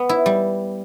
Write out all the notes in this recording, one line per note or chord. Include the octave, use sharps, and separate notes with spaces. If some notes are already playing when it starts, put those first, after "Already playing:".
Already playing: B3
E4
G3